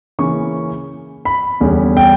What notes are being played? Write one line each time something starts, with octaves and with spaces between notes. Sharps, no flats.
C#3 E3 A#3 C#4 C#6
B5
E2 D3 G3 C#4
G5